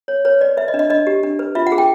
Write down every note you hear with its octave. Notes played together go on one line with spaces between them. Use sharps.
C#5
B4 C#5
B4 D5
B4 E5
D#5
D4
D#5
D4 D#5
G4
D4
B4
F4 E5
F#5
G#4
G5